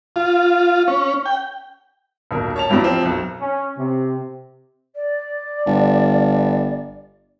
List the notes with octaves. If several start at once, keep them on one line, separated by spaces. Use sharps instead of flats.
F4
C#4
G5
D#1 B1 A#4
C#5 A5 F7
E2 G2 F#3 G3
F3 C4
B1 F#2
C#4
C3
D5
G1